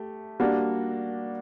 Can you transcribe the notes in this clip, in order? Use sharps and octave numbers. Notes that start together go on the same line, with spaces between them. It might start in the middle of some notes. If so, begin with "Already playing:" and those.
Already playing: A3 G4
G3 A#3 D4 F#4